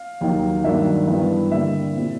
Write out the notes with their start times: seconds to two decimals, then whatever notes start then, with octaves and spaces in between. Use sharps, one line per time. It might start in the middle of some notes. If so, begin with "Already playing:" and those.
Already playing: F5
0.21 D#2 D#3 F#3
0.64 G2 D#3 F#3 A#3 D4 E5
1.07 G2 E3 G3 B3 D4
1.51 D3 G3 A#3 E5
1.95 A#2 G3 C4 E4